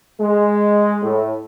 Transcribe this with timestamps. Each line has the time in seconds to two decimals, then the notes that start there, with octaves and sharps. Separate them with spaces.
0.20 G#3
1.03 A2